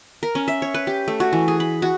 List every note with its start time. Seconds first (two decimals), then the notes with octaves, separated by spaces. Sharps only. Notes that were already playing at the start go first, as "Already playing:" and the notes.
0.23 A#4
0.35 C#4
0.48 E5
0.62 C#5
0.74 B4
0.87 G4
1.08 A3
1.20 F#4
1.33 E3
1.48 G#4
1.60 B5
1.82 F#4